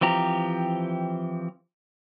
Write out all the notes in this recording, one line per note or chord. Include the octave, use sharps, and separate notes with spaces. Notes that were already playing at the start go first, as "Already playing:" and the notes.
E3 F3 C4 G4 A#5